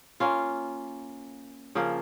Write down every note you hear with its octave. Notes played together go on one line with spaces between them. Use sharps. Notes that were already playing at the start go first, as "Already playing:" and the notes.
A#3 C#4 F4
C#3 F3 A#3